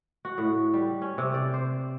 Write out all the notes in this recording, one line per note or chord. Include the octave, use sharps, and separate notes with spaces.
F#4
A2
G3
C#4
C3
D5
C5